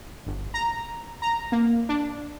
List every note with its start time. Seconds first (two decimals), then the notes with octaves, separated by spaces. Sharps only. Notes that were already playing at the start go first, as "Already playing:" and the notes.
0.26 G1
0.54 A#5
1.22 A#5
1.52 A#3
1.89 D4